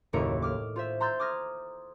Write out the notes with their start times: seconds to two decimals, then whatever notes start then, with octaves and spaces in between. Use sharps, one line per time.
0.13 F#1 D#2 A2 E4 A#4 C#7
0.42 D6 F6 D7
0.76 F4 C5 E5
1.00 A#5 C6 E6 G6 A6
1.20 D6 D#6 F6 G#6 A#6